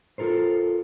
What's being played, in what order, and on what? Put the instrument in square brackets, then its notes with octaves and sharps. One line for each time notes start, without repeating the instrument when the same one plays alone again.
[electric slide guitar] F4 A4 A#4 C5